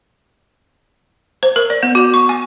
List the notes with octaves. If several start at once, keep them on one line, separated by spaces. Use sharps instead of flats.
C5
A#4
D5
B3
F#4
C#6
G#5